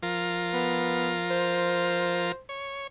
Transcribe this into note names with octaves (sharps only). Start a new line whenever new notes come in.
F3 F4 A#4
B3
C5
C#5